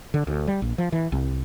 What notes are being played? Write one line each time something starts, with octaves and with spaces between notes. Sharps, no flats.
D3
D2
G3
A#1
F3
E3
C2